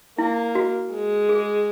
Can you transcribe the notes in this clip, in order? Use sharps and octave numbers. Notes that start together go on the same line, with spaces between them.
A#3 E4
F#4
G#3
G#4